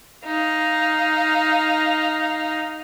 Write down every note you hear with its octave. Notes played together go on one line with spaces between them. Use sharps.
D#4 F5